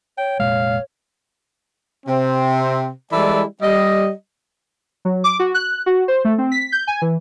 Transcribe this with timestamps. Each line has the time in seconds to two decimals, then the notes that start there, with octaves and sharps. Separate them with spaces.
0.18 C#5 G5
0.40 F1 A#2 G#3 F5
2.07 C3 C4
3.12 E3 G3 G#3 E4 A4 D5
3.61 G3 D#5
5.05 F#3
5.24 D6
5.39 F#4
5.54 F#6
5.86 F#4
6.08 C5
6.25 A3
6.38 C4
6.52 B6
6.72 G6
6.87 G#5
7.02 E3